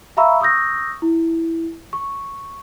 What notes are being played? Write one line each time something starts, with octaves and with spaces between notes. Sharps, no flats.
E5 F5 A#5 B5 C#6 E6
C#6 D#6 E6 G6 A#6
E4
C#6